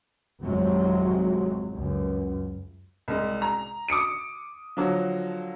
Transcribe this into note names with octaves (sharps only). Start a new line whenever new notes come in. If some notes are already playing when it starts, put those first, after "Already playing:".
G#1 F2 G#2 C3 F#3 G#3
C#2 F#2
C2 G#3
A#5
D6 D#6 C#7 D7
D3 F3 F#3 F#4